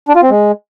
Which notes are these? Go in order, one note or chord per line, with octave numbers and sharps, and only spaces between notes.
D4
F4
C4
G#3